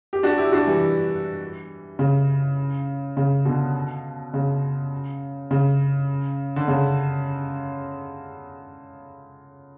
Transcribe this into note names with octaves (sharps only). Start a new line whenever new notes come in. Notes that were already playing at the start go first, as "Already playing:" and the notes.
G4
D4 F#4
E4 G4
D4 F#4
E3 G3
C#3
C#3
B2 D3
C#3
C#3
D3
C#3